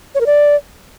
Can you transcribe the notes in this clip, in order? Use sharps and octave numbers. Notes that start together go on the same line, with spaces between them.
C#5
A#4
D5